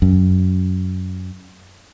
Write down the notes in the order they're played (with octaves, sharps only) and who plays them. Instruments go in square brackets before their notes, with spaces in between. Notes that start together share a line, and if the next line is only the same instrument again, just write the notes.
[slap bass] F#2